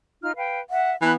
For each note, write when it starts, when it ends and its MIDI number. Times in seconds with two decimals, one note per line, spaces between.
0.22 0.31 63
0.22 0.31 65
0.22 0.31 89
0.36 0.59 71
0.36 0.59 77
0.36 0.59 79
0.70 0.96 76
0.70 0.92 78
1.02 1.14 52
1.02 1.15 59
1.02 1.10 81
1.02 1.10 83
1.02 1.10 90